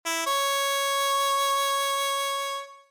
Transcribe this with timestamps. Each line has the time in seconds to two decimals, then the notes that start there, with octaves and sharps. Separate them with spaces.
0.06 E4
0.27 C#5